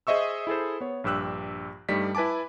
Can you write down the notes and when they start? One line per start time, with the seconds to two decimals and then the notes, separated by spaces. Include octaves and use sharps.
0.07 G#4 C5 D#5 E5 C#6 E6
0.47 E4 G#4 A4 C5
0.81 B3 C#5
1.04 A#1 G2 G4 E6 F#6
1.89 G2 G3 A3 D#4 D5 B6
2.15 E4 B4 G#5 A5 D6